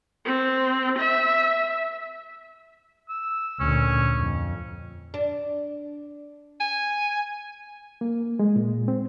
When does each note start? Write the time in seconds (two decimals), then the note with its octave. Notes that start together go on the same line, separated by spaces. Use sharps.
0.25 C4
0.98 E5
3.09 E6
3.60 D2 A#2 C#4
4.19 F2
5.14 D4
6.60 G#5
8.01 A#3
8.39 G#3
8.56 A#2
8.88 C4